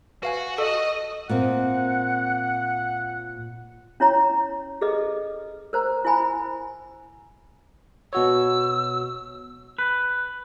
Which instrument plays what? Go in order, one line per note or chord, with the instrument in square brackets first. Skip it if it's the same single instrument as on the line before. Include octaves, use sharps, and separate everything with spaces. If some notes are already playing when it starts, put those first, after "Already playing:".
[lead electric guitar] F#4 [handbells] B4 F5 G#5
[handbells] A4 [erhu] D#5
[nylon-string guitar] A#2 A#3 C4 [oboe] F#5
[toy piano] C#4 E4 C#5 A#5
G#4 A4 B4 D#5
A#4 C5 A#5
E4 C5 G#5 B5
[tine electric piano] B2 F#4 C#5 [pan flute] E6
[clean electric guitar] B4